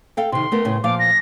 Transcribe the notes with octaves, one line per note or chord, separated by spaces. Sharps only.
A4 F5 G5
C3 D#3 C6
A3 B3 A#4
A2 C#3 G#4
A#2 F3 F5 D6
A#6